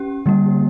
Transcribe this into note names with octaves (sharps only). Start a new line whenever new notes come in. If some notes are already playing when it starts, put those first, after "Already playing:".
Already playing: C#4 G4
D3 G3 A#3